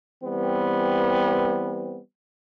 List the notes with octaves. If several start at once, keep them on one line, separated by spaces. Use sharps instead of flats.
E3 G3 B3 C4